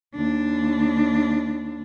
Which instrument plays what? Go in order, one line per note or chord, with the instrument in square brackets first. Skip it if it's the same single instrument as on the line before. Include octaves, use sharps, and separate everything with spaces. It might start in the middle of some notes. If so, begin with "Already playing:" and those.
[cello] D#2 D4